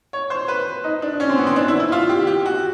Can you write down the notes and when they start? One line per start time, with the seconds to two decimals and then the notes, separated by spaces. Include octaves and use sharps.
0.13 C#5
0.30 C5
0.48 B4
0.84 D#4
1.02 D4
1.20 C#4
1.30 C4
1.38 B3
1.47 C4
1.56 D4
1.68 E4
1.80 E4
1.92 F4
2.09 G4
2.27 G4
2.45 F#4